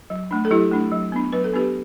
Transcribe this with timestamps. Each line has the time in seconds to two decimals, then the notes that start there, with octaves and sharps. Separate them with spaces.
0.10 F#3
0.31 A3 D4
0.45 A4
0.51 F#3 E4 G4
0.71 A3 D4
0.92 F#3
1.12 B3 D4
1.32 F#3 B4
1.44 A4
1.54 B3 D4 G4 B4